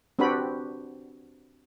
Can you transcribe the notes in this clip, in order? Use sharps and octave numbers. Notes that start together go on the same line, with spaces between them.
C4 D4 F#4 G4 B4 B5